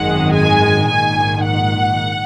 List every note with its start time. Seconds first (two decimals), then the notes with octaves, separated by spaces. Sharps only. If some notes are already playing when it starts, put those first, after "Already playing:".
Already playing: G#1 F#2 D#3 G#3 F#5
0.34 G#5
0.89 A#1 G#2 D#3 G#5
1.45 F#5